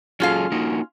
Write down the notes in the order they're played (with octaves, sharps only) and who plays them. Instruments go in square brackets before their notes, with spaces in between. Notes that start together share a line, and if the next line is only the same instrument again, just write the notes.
[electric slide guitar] F#3 G#4 A4 [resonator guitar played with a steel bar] C#4 F4 F5
[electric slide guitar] A#3 D#4 F#4